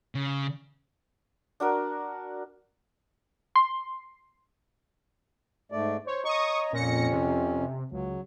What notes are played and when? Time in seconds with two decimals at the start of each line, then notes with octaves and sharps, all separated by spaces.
0.15 C#3
1.60 D4 F#4 A#4
3.56 C6
5.72 G#2 A3 D5
6.07 C5 C#5
6.25 C#5 D#5 A#5 C#6 D#6
6.73 F2 A#2 C#4 A#6 C#7
7.11 C3
7.92 C#2 F#3